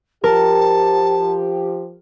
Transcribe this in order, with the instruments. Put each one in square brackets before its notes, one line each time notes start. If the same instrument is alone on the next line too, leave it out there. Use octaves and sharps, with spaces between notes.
[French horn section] F3 G4 [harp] A#4 [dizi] A5